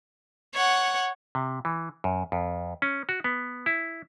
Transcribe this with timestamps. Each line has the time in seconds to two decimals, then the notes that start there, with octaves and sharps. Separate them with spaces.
0.55 C#5 F#5
1.35 C3
1.65 E3
2.04 F#2
2.32 F2
2.82 C#4
3.09 F#4
3.24 B3
3.66 E4